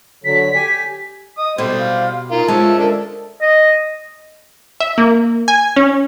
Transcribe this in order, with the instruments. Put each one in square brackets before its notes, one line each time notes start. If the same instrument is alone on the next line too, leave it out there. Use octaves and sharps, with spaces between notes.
[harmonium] D3 F#3 [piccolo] B6
[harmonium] G4 G#5
[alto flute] D#5 [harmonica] D#6
[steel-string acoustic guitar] B2 [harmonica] G3 C5 [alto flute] A4
[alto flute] F5
[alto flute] D#4 [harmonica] F4 A#4
[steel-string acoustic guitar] F3 G#3 C#4 [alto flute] F4 [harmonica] E5 A5
[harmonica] D4 A4 [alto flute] A#4
[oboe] D#5
[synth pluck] E5
A#3
G#5
C#4